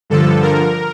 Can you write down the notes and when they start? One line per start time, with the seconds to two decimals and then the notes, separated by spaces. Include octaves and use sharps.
0.10 G2 D3 F3 A4
0.43 A#4